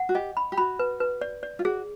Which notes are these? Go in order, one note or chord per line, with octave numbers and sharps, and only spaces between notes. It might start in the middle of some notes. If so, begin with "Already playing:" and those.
Already playing: F#5
F#4
G4 D#5
B5
G4
F#4 B5
B4
B4
D5
D5
F4
F#4 G#4